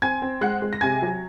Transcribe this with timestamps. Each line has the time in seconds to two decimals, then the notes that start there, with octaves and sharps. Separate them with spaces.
0.02 C4 G#5 G#6
0.22 C4
0.41 G#3 F#5 F#6
0.62 G#3
0.73 A#6
0.81 C3 G#5 G#6
1.02 F#3